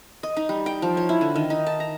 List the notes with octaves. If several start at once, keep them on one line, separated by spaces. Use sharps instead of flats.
D#5
D#4
G3
G5
F3
C#5
E4
D3
D#3
D#4
A5
A#5